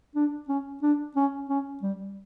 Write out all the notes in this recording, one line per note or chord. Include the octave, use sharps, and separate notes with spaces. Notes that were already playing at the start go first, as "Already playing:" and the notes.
D4
C#4
D4
C#4
C#4
G3